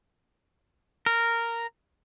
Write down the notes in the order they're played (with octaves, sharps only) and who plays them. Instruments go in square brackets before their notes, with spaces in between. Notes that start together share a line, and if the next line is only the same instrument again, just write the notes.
[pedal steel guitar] A#4